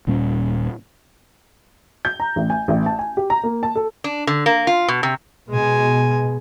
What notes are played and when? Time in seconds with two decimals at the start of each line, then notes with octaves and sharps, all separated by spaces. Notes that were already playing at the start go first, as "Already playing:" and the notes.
0.07 D#1 A#2 G3 C#4
2.05 G6
2.20 A#5
2.36 A1
2.50 G#5
2.68 A1
2.86 A5
2.99 G#5
3.17 G4
3.30 A#5
3.43 A#3
3.63 A5
3.76 A4
4.04 D4
4.27 D3
4.46 A#3
4.67 F4
4.88 B2
5.03 C3
5.50 B2 G#3 G#5